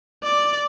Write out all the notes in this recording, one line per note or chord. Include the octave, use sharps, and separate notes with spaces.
D5